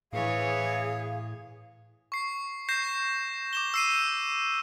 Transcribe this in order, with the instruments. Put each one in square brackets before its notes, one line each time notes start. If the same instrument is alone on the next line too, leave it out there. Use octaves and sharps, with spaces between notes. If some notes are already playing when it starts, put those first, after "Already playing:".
[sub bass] A2 [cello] E3 C#5 [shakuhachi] G#4 [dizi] F5
[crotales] C#6 C7
G6 A#6 C7 E7
D6 E7 G7
E6 C7 D#7